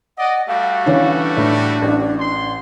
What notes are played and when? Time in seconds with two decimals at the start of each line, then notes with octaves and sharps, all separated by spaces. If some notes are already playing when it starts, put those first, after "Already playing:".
0.18 D5 D#5 F#5
0.48 G3 A3 F#4 F5
0.86 E3 C#4 D4
1.37 A2 D4
1.82 A1
2.18 C6